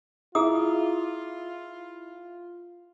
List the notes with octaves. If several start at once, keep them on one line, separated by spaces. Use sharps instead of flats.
E4 F4 G#4 A#5 D#6